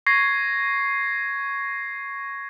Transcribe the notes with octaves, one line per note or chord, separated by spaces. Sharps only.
C#6 G#6 A#6 C7